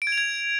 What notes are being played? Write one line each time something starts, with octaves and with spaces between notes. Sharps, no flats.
D7
G#6
F7
G#6